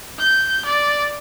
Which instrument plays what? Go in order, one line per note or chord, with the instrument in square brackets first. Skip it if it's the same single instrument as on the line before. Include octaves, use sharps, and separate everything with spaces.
[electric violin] G6
D5